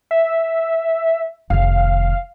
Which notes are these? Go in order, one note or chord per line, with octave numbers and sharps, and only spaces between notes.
E5
F1 D#3 F5